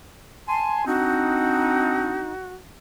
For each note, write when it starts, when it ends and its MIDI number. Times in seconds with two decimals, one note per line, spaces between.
0.48 0.85 80
0.48 0.82 81
0.48 0.85 84
0.86 2.33 60
0.86 2.33 62
0.86 2.33 63
0.86 2.53 66